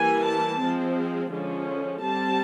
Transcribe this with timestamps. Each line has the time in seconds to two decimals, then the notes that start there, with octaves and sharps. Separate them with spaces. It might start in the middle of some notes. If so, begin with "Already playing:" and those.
Already playing: E3 G3 A#3 G#5
0.25 A5
0.59 F3 G#3 C4
1.31 D3 F3 G#3 C#4
2.02 G3 C4 A5